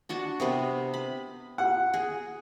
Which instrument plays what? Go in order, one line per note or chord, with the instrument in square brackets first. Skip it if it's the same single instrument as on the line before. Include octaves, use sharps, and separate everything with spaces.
[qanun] D4 F#4 A5
C3 B3 B4
B5
[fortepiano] F#5
[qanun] G#4